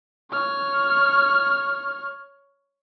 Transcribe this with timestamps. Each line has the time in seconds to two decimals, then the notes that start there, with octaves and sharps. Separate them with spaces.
0.31 C#5 F6